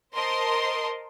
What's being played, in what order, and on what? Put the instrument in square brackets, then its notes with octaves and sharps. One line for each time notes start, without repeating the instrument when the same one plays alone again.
[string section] A#4 C5 D#5 A5 C6